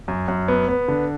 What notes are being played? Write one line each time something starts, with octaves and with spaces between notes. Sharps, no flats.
F#2
F#2
B3
B3
D3